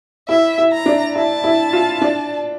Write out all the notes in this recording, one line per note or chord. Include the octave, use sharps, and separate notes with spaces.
E4 E5
E4
A#5
D4
E4 A5
E4
F4
D4